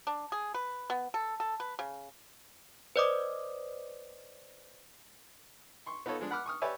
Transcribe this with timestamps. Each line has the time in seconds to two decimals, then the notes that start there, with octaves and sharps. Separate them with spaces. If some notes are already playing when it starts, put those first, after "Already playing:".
0.07 D4
0.32 G#4
0.54 B4
0.90 B3
1.14 A4
1.40 A4
1.60 B4
1.79 C#3
2.96 B4 C5 D5 D#5 D6 D#6
5.86 C6 C#6
6.06 B3 D#4 F4 A4 C#5
6.19 F3 G#3 D4
6.31 F#5 B5 D6 F6 F#6
6.46 C#6 D#6 F6
6.62 G4 B4 C#5 D5 E5 G#5